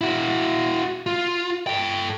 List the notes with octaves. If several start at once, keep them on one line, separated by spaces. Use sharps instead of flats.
E4 F#4
F4
A4 G5